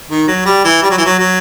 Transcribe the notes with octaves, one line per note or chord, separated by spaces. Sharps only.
D#3
F#3
G3
E3
G3
F#3
E3
F#3
F#3